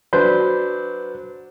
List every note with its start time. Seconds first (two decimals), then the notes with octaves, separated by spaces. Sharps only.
0.13 F#3 D4 B4 C5 G6